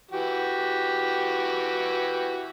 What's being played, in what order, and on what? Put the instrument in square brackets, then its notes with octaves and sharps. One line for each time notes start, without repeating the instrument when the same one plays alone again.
[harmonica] E3 F#4 G4